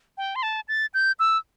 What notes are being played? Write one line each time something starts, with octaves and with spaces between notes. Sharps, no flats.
G5
C6
A5
A6
G6
E6